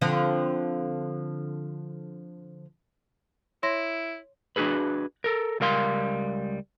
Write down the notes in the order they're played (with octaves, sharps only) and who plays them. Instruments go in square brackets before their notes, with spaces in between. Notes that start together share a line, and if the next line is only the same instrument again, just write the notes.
[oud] D3 F3 C4
[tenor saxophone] E4 [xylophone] C#5 C6 A#6
[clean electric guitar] D4 D#4 F#4 G#4 B4
A4 A#4
C#2 G3 A#4 F5 C6